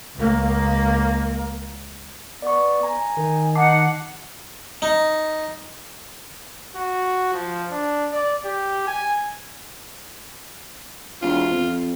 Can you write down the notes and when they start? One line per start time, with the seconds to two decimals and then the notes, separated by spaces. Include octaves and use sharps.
0.15 C#2 A#3
2.42 B3 D5 C#6
2.83 G#5 A#5
3.17 D#3
3.55 D#4 F#5 A5 D6 C7
4.82 D#4
6.76 F#4
7.33 F3
7.71 D4
8.12 D5
8.45 G4
8.87 G#5
11.22 E1 F4
11.51 F2